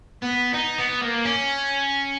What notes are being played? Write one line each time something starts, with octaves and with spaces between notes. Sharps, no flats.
B3
D#4
B3
A#3
C#4